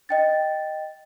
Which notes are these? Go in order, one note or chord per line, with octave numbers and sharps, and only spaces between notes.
D#5 G5 A6